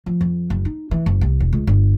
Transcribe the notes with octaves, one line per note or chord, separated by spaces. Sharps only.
F3
F2
F#1
D#4
E3
F#1
C2
E1
C#2
G1